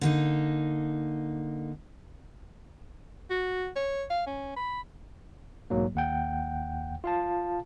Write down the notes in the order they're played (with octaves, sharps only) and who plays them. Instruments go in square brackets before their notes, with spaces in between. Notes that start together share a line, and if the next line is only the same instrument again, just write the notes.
[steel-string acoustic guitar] D3 A#3 D#4
[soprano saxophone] F#4
C#5
F5
C#4
B5
[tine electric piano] B1 G#2 F#3 A#3
D#2 F#5 G5
F4 F5 A5